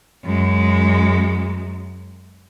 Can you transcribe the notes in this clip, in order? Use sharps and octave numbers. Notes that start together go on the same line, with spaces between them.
F#2 G#3